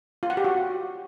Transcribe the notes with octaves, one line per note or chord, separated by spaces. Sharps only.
F4
F#5
G4
F#4